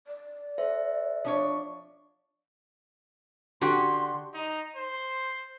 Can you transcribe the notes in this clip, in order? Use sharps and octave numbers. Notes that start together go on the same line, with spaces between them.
D5
A4 C5 E5
F3 D4 C#5
D3 F#4 G4 C6
D#4
C5